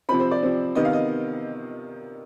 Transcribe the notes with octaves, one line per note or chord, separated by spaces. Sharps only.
C3 F3 C4 B5
C5
D5
C3 F3 C4
C3 D#3 B3 D#5
F5
D#5